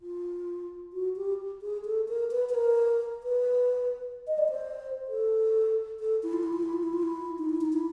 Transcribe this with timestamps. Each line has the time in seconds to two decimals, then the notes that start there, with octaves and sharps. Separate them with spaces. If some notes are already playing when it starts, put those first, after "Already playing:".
0.01 F4
0.93 F#4
1.16 G4
1.62 G#4
1.85 A4
2.08 A#4
2.31 B4
2.49 B4
2.54 A#4
3.23 B4
4.27 D#5
4.38 D5
4.50 C5
5.08 A4
6.00 A4
6.23 E4
6.33 F4
6.43 E4
6.53 F4
6.63 E4
6.73 F4
6.83 E4
6.93 F4
7.03 E4
7.38 D#4
7.49 E4
7.61 D#4
7.73 E4